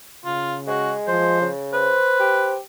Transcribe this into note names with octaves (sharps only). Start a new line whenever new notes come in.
C#3 F4
G#3 F#4
F3 C5
C#3
B4 C5
G4